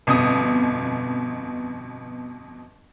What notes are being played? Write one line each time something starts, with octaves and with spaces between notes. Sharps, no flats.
G1 F2 B2 D#6